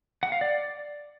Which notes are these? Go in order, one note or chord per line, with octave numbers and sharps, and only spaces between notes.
F#5
F5
D5